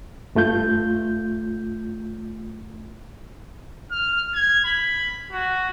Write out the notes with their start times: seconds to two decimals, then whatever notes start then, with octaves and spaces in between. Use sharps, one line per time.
0.35 G2 A3 F4 G6
3.91 F6
4.34 G#6
4.65 B5
5.32 F#4